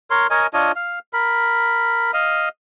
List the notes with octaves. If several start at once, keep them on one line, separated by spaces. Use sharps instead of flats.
A#4 C#5 C6
A#4 C#5 D#5 G#5
D4 F4 C#5 D#5
F5
A#4 B5
D#5 F5